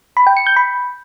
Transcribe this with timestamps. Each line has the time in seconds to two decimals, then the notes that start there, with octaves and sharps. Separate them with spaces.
0.17 B5
0.27 G5
0.37 C#7
0.47 G6
0.56 B5